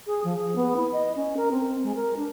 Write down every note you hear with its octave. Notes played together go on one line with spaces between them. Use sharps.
G#4
F3
G#4
B3
E4
D#5
C#4
A#4
C4
G#3
A#4
D4